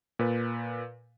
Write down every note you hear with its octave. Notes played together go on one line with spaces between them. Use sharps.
A#2 B4